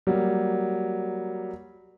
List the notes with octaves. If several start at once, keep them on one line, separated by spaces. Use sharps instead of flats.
F#3 G3 A#3